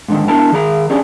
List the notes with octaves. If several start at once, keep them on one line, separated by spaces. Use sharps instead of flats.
G#2 D3 D#3
B3 D4 E4 A#4 A5 A#5
D#3 G#4 A#5
C#4 D4 G4 G#4